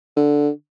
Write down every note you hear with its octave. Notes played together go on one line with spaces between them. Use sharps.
D3